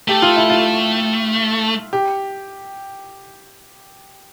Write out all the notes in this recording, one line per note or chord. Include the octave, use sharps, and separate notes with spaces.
A3 G4
F4
E4
F4
G4